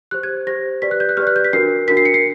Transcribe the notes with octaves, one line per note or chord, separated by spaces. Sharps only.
G4 C5 F#6
G#6
G4 C5 A#6
G4 B4 D5 B6
F#6
G6
F#6
G4 B4 D5 F6
F#6
G6
B6
D4 F#4 A#4 C7
D4 F#4 A#4 B6
C7
C#7
C7